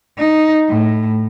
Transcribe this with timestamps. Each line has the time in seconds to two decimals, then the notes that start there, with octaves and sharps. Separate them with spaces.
0.18 D#4
0.70 A2